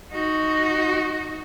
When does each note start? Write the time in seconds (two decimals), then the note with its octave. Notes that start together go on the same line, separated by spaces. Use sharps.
0.13 D#4 F#4